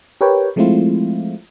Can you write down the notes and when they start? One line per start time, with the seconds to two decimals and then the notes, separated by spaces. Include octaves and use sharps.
0.21 G4 A#4 B4 C#5 G5
0.56 F3 G#3 A3 C4 E4 F4